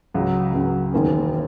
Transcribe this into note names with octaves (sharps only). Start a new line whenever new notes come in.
C#2 C#3 F#3
C#2 C#3 F#3
E1 D#2 D#3 A#3 C#4